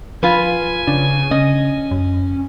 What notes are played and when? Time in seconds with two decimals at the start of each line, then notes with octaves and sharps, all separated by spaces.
0.23 F3 F4 B4 G#5
0.87 C#3 D4
1.31 C#3 C#4 D#5
1.91 F#2